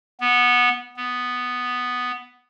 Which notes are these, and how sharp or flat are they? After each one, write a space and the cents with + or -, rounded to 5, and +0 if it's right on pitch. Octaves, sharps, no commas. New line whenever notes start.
B3 -10
B3 +5